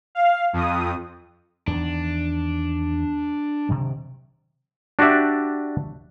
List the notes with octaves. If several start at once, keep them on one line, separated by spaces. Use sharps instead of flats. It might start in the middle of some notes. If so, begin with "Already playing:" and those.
F5
F2 D#6
E2 D#3 D4
C3 D#3 F#3
D4 F#4 G4 D5 E5